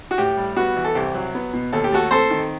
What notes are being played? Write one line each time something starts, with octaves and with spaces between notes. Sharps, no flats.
F#4
A2 G4
G3
B3 F#4
E3
A4
C2 G4
F#3
B3
B2
D#2 A4
G4
A3 F#4 A4
C4 A4 C5
D#3